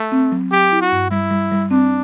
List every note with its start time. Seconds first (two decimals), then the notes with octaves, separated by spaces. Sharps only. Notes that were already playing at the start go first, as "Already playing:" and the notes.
Already playing: A3
0.12 C4
0.32 F#3
0.52 F#3 G4
0.72 E4
0.81 F#4
0.92 G2
1.11 G3 E4
1.31 G3
1.52 G3
1.71 C4 D4